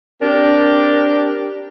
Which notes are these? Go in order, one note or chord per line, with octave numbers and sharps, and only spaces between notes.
C4 D4 G4 A#4